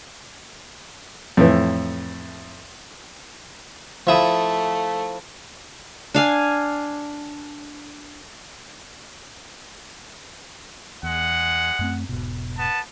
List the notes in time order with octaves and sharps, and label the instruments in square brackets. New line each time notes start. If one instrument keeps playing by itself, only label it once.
[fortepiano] F2 A2 E3
[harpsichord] F3 E4 D#6 [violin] A3
[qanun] D4 F5 G#5
[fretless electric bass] E2 [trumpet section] G#3 F#5
[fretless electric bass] F#2 A3 C4
E1 G#2 B2
[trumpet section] B3 A5